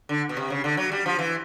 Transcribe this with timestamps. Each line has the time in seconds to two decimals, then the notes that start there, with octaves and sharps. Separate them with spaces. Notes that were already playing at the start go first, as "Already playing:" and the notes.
0.09 D3
0.29 B2
0.37 C3
0.50 C#3
0.64 D3
0.77 F#3
0.92 G3
1.06 F3
1.19 E3